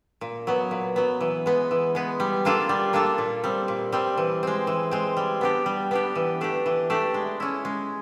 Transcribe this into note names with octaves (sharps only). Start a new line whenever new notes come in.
A#2
F#3 B3
A#2
F#3 B3
E3
G#3 B3
E3
G#3 B3
G3
A#3 D4 F4 A4
G3
A#3 D4 F4 A4
A#2
G3 C4
A#2
G3 C4
E3
G#3 C4
E3
G#3 C4
G3
B3 D4 G4
G3
B3 D4 G4
E3
A3 D4 G4
E3
A3 D4 G4
G#3
C#4 E4
G#3